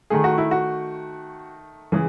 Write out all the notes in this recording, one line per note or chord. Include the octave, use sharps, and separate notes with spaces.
D#3 A3 G#4
F#4
E4
F#4
C#3 E3 G#3 G#4